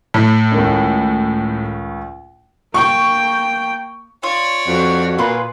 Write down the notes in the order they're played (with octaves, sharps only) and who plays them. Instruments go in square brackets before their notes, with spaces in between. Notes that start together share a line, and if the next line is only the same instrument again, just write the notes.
[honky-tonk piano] A2
[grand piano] C#2 D#3 C#4
[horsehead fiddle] A#3 G5 [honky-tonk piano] C#6
[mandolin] F4 [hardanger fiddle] C#5 D5
[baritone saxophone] F2 [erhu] F#4
[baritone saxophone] A#2 [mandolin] F4 G#4 B4